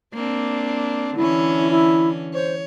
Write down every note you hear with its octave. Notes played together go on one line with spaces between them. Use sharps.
A#3 C4 D4
D3 E3 C#4 E4
E4
C5 C#5